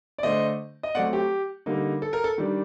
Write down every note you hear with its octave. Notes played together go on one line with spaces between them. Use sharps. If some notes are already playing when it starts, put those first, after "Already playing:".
D5
D3 A3 D4 C5 D#5
D#5
F#3 A3 C4 D5 F#5
G4
D3 G3 A#3 D#4
A4
A#4
A4
D#3 G3 D4